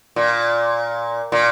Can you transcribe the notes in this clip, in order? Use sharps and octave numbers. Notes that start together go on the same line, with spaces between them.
A#2
A#2